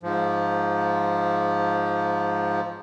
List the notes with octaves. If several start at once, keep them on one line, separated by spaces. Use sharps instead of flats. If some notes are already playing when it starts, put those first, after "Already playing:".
G#2 F3